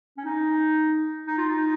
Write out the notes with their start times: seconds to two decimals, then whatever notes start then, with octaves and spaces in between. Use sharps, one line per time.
0.17 C#4
0.25 D#4
1.27 D#4
1.38 F4
1.49 D#4